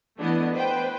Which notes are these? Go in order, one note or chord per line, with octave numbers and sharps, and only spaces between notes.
E3 A3 B3 D4 E4 D#5
B4 C5 G5